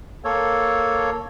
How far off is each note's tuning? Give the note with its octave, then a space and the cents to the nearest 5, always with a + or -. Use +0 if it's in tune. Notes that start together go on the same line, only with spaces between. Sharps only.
A#3 +0 A4 +0 C#5 -5